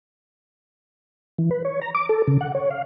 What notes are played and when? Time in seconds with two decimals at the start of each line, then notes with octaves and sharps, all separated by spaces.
1.38 E3
1.51 B4
1.65 C#5
1.81 A#5
1.95 D6
2.09 A4
2.28 C#3
2.41 F#5
2.55 C#5
2.71 F5